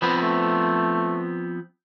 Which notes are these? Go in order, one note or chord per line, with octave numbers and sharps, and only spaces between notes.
F3 B3 C4 B4
A3